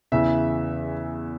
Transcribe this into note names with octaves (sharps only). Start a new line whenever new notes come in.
E2 C#3 E3 E5